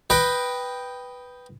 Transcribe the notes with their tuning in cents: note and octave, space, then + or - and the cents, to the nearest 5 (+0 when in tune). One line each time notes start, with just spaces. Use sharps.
B4 +0 D#5 +0 G5 +0